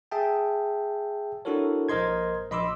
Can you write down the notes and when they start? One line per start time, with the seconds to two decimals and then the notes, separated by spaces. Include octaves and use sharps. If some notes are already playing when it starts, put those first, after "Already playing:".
0.11 G#4 E5 G5 A5
1.45 D4 E4 F#4 A4 A#4 C#5
1.89 A#1 A#4 C5 D#5 C6 G#6
2.50 A#1 D#5 B5 C6 D6 E6